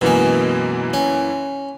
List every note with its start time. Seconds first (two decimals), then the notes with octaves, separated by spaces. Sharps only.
0.01 F#2 B2 E3 G#3 A#3
0.93 C#4